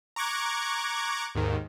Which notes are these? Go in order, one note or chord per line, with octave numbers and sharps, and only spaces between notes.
A#5 C#6 D6 F#6 G#6
D#2 G#2 D#3